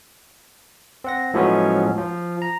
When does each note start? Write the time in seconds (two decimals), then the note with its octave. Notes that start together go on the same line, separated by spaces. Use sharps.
1.04 C4 F#5 A#6
1.34 A2 F3 F#3 G#3 B3 C#4
1.98 F3
2.42 A#5